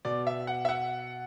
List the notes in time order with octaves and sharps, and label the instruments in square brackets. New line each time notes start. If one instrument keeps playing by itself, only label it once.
[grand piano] B2 D5
E5
F#5
E5
F#5